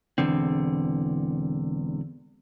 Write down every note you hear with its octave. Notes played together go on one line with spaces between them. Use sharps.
E1 E2 D3 C4